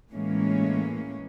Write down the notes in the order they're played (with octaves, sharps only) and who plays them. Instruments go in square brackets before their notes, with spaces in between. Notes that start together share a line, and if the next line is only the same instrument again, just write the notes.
[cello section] A2 E3 G#3 A#3 C#4